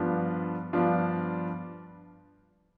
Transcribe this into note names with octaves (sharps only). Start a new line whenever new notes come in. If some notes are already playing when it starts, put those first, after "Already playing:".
Already playing: G2 F3 B3 D4 F4
G2 F3 B3 D4 F4